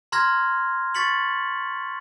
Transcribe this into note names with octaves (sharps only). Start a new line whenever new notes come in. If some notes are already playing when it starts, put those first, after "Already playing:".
A#5 C6 F6 G#6 A#6
C#6 A6 B6 C#7 F#7